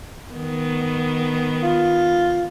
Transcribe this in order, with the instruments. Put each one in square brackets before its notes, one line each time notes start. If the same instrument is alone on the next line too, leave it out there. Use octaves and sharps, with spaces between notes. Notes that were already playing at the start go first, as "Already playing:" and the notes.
[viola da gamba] D#3 B3
[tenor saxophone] F4